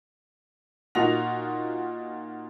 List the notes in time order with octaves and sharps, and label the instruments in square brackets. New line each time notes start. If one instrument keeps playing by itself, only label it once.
[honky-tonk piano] A#2 D#4 F4 F#4 A#6 F7